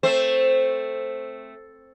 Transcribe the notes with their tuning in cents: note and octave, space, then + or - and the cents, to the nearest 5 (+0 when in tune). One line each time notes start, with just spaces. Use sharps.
A3 +0 C4 +5 C5 +0